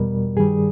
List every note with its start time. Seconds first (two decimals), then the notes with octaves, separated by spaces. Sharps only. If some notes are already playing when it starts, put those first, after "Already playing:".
Already playing: E2 B2 G3 A#4
0.37 G2 D#3 G3 G#4